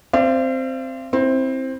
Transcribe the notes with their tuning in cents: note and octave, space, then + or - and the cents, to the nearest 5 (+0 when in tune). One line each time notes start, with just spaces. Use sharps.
C4 +0 D5 +15 F5 -45
C4 +10 E4 -10